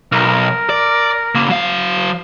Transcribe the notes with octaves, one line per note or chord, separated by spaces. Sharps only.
B1 A#4
D5
C#3 A#3
F#3 F5